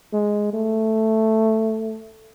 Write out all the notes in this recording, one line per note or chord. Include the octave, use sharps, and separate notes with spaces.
G#3
A3